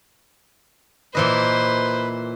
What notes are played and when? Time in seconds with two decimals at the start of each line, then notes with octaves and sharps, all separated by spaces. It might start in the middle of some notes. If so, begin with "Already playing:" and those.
1.15 A#2 E3 B4 C5 D#5